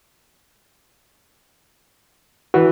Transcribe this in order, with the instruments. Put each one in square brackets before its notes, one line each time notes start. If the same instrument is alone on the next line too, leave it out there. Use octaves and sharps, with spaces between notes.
[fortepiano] E3 [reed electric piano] F#4